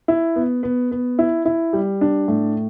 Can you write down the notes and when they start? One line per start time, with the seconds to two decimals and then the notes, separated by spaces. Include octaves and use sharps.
0.08 E4
0.36 B3
0.63 B3
0.91 B3
1.19 E4
1.45 E4
1.73 G3
2.01 D4
2.28 A2